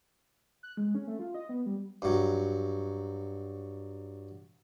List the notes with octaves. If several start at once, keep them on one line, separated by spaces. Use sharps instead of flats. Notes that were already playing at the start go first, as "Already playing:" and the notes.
F#6
G#3
C#4
A3
F4
D#5
B3
G3
G2 F#3